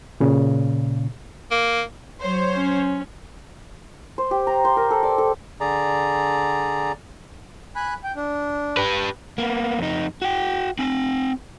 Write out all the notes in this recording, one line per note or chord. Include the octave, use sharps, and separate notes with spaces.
A#2 C#3
A#3
F#3 C5 C#5
C#4
C5
G4
A#5
C5
A#4
A4
D5
A4
D3 G#4 D5 A#5
G#5 B5 F#6
G5
D4
G4 B4
A#3 B3
F2 D#4
F#4 G5
C4 G#5